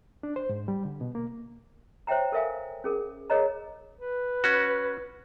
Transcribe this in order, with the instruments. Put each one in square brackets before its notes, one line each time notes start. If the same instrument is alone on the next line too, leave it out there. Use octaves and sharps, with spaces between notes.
[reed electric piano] D4
C5
G#2
G3
D3
B2
A#3
[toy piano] C5 C#5 E5 G5 A#5
A4 A#4 E5 F5 G#5
C#4 G#4 A#4
G#4 A#4 C#5 D#5 A#5
[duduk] B4
[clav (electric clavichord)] C#4 F#4